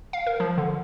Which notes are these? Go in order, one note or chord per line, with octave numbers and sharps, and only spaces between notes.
F5
A#4
F3
D3